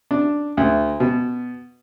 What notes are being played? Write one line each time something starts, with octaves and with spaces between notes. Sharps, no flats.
D4
D2
B2